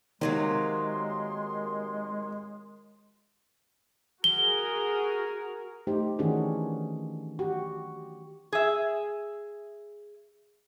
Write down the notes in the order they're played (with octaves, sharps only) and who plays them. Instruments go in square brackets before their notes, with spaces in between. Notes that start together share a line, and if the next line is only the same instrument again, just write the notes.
[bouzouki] C3 F#3 A#3 [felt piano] D#3 [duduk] G#3 [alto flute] C6
[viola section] F#4 G#4 A#4 [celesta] G7
[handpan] A3 D#4 G4 C5
D#3 E3 C#4 D4 F#4 G#4
F#4 G4
[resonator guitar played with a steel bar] G#4 E5